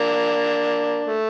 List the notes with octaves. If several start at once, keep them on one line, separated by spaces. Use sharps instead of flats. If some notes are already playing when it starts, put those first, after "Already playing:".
Already playing: A#3 D4
A3